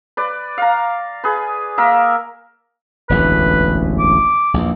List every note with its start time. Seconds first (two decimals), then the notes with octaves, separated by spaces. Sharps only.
0.17 B4 D5
0.58 F5 A#5
1.24 G#4 B4
1.78 A#3 A#4 E5
3.09 E1 A1 D2 B4
3.99 D6
4.54 A#1 E2